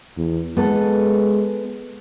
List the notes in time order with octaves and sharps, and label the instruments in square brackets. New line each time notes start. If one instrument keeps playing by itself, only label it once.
[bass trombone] E2
[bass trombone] G#3 [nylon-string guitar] B3 A4